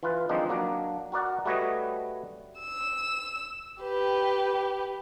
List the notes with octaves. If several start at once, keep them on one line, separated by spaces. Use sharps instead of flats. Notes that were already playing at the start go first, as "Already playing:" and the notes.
E3 F4 B4
D#3 F3 G#3 C4 D4 D#4
F#3 A#3 D4
F#4 A#4 D5 F#5
G3 A3 F#4 B4 C#5 D#5
E6
G4 B4